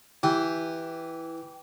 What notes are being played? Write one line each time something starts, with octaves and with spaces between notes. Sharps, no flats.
E3 G4